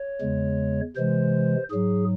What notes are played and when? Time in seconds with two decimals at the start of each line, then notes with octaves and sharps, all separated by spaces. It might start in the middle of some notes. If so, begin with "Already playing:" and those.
Already playing: C#5
0.21 E2 C#3 G#3
0.96 C3 E3 G#3 C5
1.71 G#2 F#3 G#4